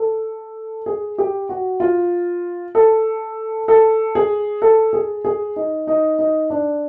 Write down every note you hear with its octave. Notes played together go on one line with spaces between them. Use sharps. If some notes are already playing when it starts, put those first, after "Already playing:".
Already playing: A4
G#4
G4
F#4
F4
A4
A4
G#4
A4
G#4
G#4
D#4
D#4
D#4
D4